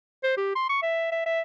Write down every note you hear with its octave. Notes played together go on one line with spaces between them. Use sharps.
C5
G4
C6
C#6
E5
E5
E5